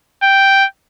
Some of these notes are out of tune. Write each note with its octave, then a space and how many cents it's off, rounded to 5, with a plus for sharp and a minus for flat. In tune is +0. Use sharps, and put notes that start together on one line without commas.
G5 +0